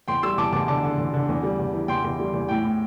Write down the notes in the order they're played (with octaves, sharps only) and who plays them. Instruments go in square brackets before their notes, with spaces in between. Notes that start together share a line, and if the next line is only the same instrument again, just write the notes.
[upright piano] E2 G5 C6
G3 C6 E6
E2 A5 D6
E2 A5 D6
D3 A5 D6
D3
E2
D3
E2
G3
E2
E3
E2 G5 C6
E2
G3
E2
A2 G5
A2